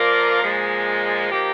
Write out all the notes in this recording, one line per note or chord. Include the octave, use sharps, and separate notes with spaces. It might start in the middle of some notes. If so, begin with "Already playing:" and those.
Already playing: F3 A#3 F4 A#4 D5
A#2 F3 G#3
F3 A#3 D#4 G4